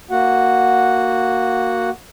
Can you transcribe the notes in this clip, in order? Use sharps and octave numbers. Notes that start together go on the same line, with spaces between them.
A#3 F#4 F#5